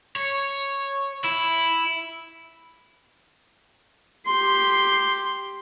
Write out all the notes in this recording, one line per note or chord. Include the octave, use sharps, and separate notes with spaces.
C#5
E4
G4 C6